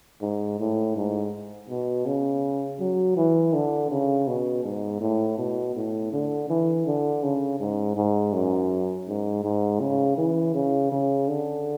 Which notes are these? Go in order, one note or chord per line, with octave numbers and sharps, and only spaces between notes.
G#2
A2
G#2
B2
C#3
F#3
E3
D3
C#3
B2
G#2
A2
B2
A2
D3
E3
D3
C#3
G#2
G#2
F#2
G#2
G#2
C#3
E3
C#3
C#3
D3